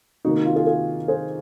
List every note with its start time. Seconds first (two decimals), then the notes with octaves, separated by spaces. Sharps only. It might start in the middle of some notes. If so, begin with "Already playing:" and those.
0.25 C3 D#3 A#3 D#4 F#4
0.36 D#4
0.45 F4
0.56 F4 G#4
0.67 F4 G#4
1.08 G#4 C5